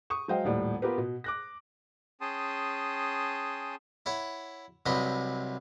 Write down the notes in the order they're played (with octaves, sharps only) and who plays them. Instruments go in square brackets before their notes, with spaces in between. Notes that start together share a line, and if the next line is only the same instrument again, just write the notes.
[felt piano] C#6 D#6
F#3 G#3 C5 D#5 F5 G5
D#1 A2 G3 F#5
B3 F4 G4 A#4 B4
B2
D6 F#6 A#6
[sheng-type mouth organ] C#4 G#4 G5 A5 C6 D#6
[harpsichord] E4 C#5 F#5
C2 C3 F#3 B4 D#5